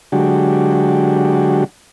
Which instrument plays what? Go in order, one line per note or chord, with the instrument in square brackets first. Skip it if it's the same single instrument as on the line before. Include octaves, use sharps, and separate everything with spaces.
[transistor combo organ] D3 F#3 G#3 D4 F#4 G4